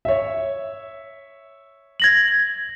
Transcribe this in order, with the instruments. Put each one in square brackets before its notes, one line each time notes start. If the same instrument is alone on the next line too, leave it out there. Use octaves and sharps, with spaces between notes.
[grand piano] C#5 E5
[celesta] G#6 A#6 F#7